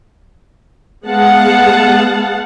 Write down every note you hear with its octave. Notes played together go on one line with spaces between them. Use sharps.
G#3 B3 F5 F#5 A5